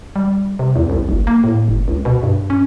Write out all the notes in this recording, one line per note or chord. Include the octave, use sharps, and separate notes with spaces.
G3
C3
E2
C2
F#1
A#3
A2
F#1
C#2
B2
G2
C#4